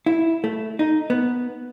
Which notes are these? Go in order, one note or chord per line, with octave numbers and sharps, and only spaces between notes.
E4
A3
D#4
B3